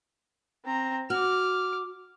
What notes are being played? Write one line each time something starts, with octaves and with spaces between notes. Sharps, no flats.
C4 A#5
F#4 D6 F6